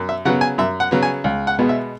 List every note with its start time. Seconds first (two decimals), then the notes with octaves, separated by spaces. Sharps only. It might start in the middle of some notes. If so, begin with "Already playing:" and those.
Already playing: F#2
0.09 E5
0.25 C#3 F#3 B3 F#5
0.41 G#5
0.58 F#2 E5
0.80 F#5
0.91 C#3 F#3 B3
1.02 G#5
1.24 C#2
1.47 F#5
1.59 B2 G#3 B3
1.69 E5